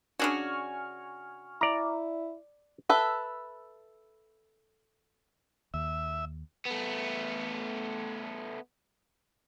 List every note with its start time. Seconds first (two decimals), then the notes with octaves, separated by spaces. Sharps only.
0.19 C#3 D4 F#4 G#5 C#6 F6
1.61 E4 D5 A#5
2.89 A4 B4 E5
5.74 D#2 E5
6.66 A3 B3